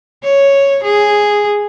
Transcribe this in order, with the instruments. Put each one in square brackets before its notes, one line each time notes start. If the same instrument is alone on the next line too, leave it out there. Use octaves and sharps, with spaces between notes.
[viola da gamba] C#5
G#4